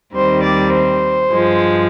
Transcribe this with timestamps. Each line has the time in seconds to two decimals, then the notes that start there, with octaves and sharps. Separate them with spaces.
0.15 D#2 D#3 G3 C4 C5
0.44 D5
0.74 C5
1.32 G2 F3 G#3